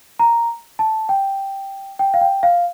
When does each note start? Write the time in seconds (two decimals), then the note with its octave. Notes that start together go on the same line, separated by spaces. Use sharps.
0.19 A#5
0.79 A5
1.09 G5
1.99 G5
2.14 F5
2.21 G5
2.43 F5